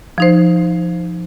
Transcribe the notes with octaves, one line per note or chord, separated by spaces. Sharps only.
F3 D#4 C5